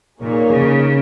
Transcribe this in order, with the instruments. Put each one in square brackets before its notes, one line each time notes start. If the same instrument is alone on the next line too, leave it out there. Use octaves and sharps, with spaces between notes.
[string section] A#2 [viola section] A#3 D#4 G#4 C#5
[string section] C#3